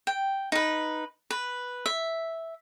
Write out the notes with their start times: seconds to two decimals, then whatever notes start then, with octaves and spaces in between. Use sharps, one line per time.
0.07 G5
0.52 D#4 B4
1.30 B4
1.86 E5